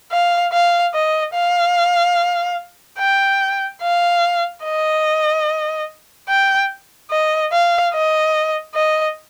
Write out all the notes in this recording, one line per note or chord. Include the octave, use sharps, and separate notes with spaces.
F5
F5
D#5
F5
G5
F5
D#5
G5
D#5
F5
D#5
D#5